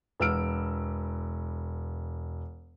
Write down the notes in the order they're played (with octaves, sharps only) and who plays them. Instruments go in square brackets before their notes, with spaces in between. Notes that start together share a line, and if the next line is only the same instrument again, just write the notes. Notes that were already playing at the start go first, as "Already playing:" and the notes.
[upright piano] E1 B4 E6 F6 D7